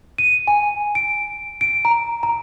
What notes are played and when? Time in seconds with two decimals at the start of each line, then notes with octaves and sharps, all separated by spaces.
0.18 D#7
0.47 G#5
0.95 D7
1.61 D7
1.85 A#5
2.23 A#5